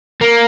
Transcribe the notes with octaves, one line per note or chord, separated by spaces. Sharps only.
A#3